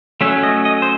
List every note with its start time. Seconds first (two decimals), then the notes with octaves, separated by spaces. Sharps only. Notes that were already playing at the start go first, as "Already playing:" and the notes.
0.21 F#3 A3 C#4 E5
0.43 D#5
0.65 D#5
0.82 C5